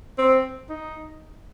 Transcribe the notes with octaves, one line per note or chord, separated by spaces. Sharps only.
C4
D#4